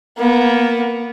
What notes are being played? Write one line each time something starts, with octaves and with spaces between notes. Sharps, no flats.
A#3 B3